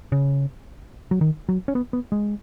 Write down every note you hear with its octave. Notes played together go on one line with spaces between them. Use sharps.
C#3
F#3
D#3
F#3
C#4
B3
B3
G#3